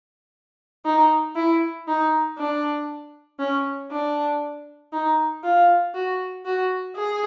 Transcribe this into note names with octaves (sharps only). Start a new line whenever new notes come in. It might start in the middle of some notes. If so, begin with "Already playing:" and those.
D#4
E4
D#4
D4
C#4
D4
D#4
F4
F#4
F#4
G#4